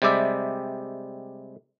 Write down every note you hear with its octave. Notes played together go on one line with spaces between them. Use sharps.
C3 G3 G#3 G4 D5 E5